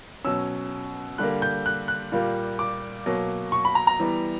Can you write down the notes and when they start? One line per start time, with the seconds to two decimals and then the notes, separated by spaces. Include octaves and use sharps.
0.24 B2 F#3 C#4 E6
1.18 D3 G3 A#3 F#6
1.42 G6
1.66 F#6
1.88 F#6
2.12 A#2 G3 A#3
2.59 D6
3.06 B2 F#3 A#3
3.52 C#6
3.65 B5
3.75 A#5
3.87 A#5
4.00 E3 G3 B3